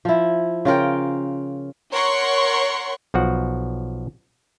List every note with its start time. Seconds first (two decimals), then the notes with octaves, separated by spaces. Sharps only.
0.05 F3 E4
0.65 C#3 F4 A#4 G5
1.92 A#4 C#5 F#5 C6 C#6
3.14 B1 F3 F#4 F#5